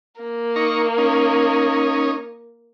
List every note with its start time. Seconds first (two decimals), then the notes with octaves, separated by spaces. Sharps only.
0.21 A#3
0.56 D#4 A#5 C#6
0.98 C#4 D#4